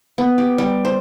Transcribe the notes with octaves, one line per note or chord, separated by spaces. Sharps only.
B3
G4
G3
C5